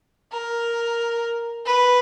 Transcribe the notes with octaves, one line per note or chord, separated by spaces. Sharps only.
A#4
B4